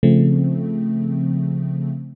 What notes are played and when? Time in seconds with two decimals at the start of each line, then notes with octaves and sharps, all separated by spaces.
0.03 C#3 F3 A3 C4